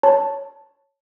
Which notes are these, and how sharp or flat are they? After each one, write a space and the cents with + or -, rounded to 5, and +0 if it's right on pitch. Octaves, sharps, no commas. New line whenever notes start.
C#5 +0 A5 +0